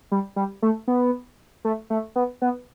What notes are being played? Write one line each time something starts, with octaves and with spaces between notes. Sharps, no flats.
G3
G3
A3
B3
A3
A3
B3
B3